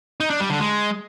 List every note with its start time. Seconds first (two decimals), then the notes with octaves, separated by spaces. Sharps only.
0.20 D#4
0.30 D4
0.40 G3
0.50 D3
0.60 G#3